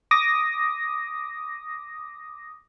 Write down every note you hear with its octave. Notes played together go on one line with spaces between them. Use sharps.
D6 D#6 A#6